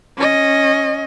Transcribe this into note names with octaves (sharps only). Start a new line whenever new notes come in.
C#4 D#5